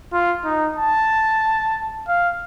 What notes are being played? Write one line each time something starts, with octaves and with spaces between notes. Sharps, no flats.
F4
D#4
A5
F5